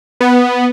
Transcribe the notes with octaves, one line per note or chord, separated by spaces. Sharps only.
B3